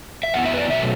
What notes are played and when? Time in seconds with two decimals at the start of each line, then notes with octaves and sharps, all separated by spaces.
0.23 E5
0.34 F#2 F#3 B3 E4 F#5
0.46 E5
0.54 B4
0.57 D5
0.69 B2 F#3 A3 E5